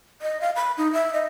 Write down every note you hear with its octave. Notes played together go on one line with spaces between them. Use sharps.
D#5
F5
B5
D#4
E5
D#5